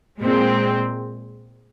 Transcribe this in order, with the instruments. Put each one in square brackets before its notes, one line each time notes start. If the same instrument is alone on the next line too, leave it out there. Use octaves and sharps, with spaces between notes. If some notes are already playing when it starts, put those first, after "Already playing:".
[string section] A#2 G#3 C4